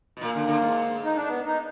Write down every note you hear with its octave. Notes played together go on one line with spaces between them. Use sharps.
B2
A#2 A#3
D3
D3
G#2
D#4
D4
B3
D#4